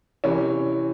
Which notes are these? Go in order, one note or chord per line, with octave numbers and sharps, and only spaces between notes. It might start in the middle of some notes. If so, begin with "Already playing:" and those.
C3 E3 C#4